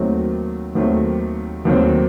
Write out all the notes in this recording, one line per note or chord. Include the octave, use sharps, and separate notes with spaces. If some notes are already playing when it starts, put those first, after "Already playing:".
Already playing: D#2 D#3 F#3 A3 C4
D#2 D#3 F#3 A3 C4
D#2 D#3 F#3 A3 C4